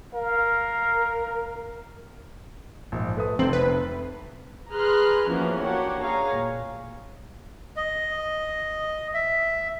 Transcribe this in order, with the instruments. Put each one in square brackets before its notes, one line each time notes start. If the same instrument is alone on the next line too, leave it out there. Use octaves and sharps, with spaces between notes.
[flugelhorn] A#4 [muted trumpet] F5
[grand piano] A#1 G#2
A3 B4 D#6
[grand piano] F1 C7 F#7 [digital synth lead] C4
[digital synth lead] B4
[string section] G#4 B4 A#5 C6 F6 F#6
E3 F3 A#3 B3 C#4 F#4
A#3 D4 F#4 G4 C#5 F#5
G#4 C#5 F5 A#5
A#2
[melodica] D#5
E5